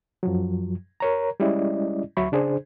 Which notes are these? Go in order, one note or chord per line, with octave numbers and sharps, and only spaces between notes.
F#2 F3 F#3
A#4 C#5 A#5
G3 G#3 C#4 E4 D5 D#5
D2 F#3 E5 B5 C#6
C#3 D4 G#4 C5